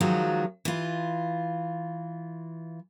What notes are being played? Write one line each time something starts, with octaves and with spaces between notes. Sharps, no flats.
D#3 F3 F#3 G#3 F4 F#4
E3 F4